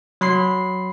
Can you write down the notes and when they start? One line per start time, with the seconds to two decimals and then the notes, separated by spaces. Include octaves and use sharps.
0.21 F#3 B5 C6 C7